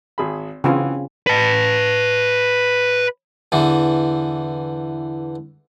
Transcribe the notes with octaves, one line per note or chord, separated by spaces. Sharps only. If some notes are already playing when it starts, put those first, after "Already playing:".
G#1 G#4 B5
C#3 E3 C4 F4 F#4 G#4
B4 A5
E2 D3 E3